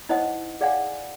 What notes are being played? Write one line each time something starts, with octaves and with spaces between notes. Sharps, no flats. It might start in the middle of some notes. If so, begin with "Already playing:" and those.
D#4 E4 C5 D#5 F#5 D#6
G#4 D5 F5 F#5 G#5